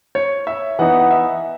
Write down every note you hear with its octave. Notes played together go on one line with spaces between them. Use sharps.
C#5
E5
E3 B3 D#4 F#5
F#5
E5